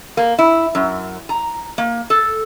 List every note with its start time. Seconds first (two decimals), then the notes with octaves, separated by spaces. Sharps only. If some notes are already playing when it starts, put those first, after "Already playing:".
0.17 A#3
0.39 E4
0.75 F#2
1.29 A#5
1.78 A#3
2.10 A4